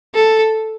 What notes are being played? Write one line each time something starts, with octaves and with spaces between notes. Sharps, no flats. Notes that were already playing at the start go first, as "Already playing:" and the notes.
A4